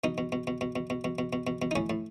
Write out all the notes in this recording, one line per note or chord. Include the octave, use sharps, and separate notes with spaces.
B2 D#4
B2
B2
B2
B2
B2
B2
B2
B2
B2
B2
B2
D#4
A2 C#4
A2